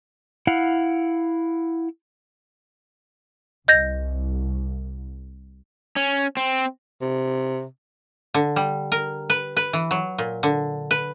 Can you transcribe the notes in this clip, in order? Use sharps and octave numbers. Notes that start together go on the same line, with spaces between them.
E4 F5 F#5
C2 D#5 G6 A#6
C#4
C4
C3
D3
G3
A#4
B4
B4
E3
F#3
A#2
D3
B4